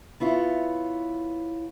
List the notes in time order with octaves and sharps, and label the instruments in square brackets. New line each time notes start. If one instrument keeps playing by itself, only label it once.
[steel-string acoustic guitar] B3 E4 F4 C#5